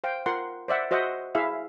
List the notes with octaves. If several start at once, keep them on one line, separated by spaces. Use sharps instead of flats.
C5 F5 G5
F4 A#4 F#5 C6
C5 D5 E5 F#5
F#4 C5 D#5 E5 F#5
E4 G#4 E5 F5